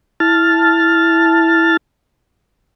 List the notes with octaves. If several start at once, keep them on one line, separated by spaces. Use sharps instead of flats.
E4 A5 F6 A6